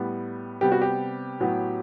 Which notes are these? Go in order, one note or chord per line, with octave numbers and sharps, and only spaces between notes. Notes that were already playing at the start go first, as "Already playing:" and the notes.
Already playing: A2 G3 B3
C3 G3 B3 G4
F#4
G4
A2 F#3 B3